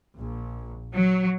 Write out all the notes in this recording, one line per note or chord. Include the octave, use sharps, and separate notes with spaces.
A#1
F#3